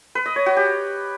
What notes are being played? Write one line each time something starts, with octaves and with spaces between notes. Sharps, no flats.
B4
D#5
C#5
F#4
G4